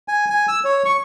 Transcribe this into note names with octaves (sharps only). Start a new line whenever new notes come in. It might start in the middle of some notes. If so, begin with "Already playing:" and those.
G#5
G#5
E6
C#5
C#6